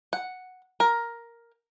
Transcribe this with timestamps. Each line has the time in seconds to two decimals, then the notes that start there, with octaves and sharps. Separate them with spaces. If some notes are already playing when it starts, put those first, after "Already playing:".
0.13 F#5
0.80 A#4